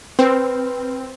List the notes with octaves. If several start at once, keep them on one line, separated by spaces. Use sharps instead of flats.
C4 B4